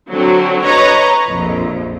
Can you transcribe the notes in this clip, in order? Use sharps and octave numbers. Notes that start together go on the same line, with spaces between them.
D3 F#3 C4
B4 C#5 D#5 A#5
A#1 F2